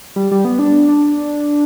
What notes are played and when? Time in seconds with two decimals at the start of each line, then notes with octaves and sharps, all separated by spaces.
0.16 G3
0.31 G3
0.45 B3
0.59 D4
0.89 D4